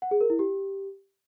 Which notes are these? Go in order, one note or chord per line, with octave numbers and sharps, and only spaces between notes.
F#5
G#4
A#4
E4
G4